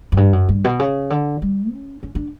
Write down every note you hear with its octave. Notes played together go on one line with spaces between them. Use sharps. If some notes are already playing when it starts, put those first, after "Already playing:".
F#2
G2
F#2
G2
B2
C#3
D3
G3
C#4
C#4
D4